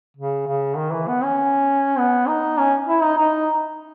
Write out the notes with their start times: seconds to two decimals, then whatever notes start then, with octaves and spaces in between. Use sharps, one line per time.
0.17 C#3
0.47 C#3
0.77 D#3
0.93 E3
1.08 B3
1.23 C#4
1.98 B3
2.28 D#4
2.58 C#4
2.88 E4
3.03 D#4
3.18 D#4